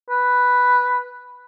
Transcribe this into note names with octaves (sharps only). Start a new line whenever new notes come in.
B4